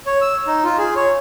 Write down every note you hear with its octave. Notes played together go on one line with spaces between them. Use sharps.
C#5
E6
D#4
F4
G#4
C#5